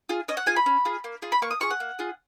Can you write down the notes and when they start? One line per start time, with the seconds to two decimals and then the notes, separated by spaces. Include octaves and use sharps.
0.09 F4 G#4
0.28 C#4 D#5
0.37 F#5
0.46 F4 G#4 G#5
0.56 B5
0.66 C#4
0.85 F4 G#4
1.04 A#3
1.22 F4 G#4
1.32 B5
1.42 A#3 C#6
1.51 D#6
1.60 F4 G#4 C#6
1.71 F#5
1.80 A#3
1.99 F4 G#4